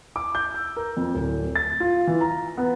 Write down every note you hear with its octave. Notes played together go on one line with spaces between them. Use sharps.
D6
G6
E6
A#4
F2
D1
A6
F4
E3
A#5
B3